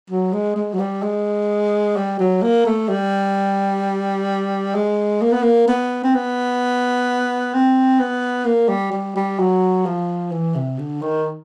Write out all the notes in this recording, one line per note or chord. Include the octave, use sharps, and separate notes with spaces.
F#3
G#3
G#3
F#3
G3
G#3
G3
F#3
A#3
A3
G3
G#3
A#3
B3
A#3
B3
C4
B3
C4
B3
A#3
G3
G3
G3
F#3
F3
E3
C3
D3
D#3